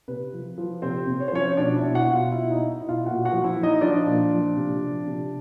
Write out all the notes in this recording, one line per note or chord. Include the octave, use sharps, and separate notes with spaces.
C3 B4
F3
F3
C3 C4 C5
C3
C#5
C5
F3 C#4 C#5
B2 D4 D5
E4 E5
B2
F#4 F#5
B2
F4 F5
B2 E4 E5
D#4 D#5
B2
E4 E5
B2
F4 F5
A#2 F#4 F#5
F#4 F#5
F3
E4 E5
F3
D#4 D#5
F3 D4 D5
A#2
F3
C3
F3
C3